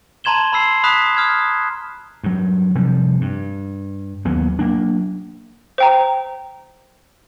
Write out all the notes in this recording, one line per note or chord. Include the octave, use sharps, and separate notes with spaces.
A5 A#5 C6 G#6 E7 G7
B5 C6 E6 C7
B5 D#6 F#6 B6 E7
D#6 F6 G#6
G2 F#3
C3 F3 G3
G2
D#2 F#3 A#3 B3
F#3 A#3 D4
C5 G5 A#5